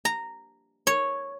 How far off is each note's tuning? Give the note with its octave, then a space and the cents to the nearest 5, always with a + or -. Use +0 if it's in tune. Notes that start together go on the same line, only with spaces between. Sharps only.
A#5 -10
C#5 -5